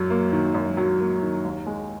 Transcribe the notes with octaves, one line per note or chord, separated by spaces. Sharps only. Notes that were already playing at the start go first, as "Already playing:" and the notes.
Already playing: F#2 F#3
A#3
D#3
F#2
F#3
A#3
D#3
D#2
G#3